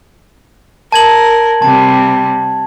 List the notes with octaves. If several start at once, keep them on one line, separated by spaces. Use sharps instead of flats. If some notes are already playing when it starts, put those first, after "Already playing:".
A#4 A5 G#6 F#7
C3 G3 A5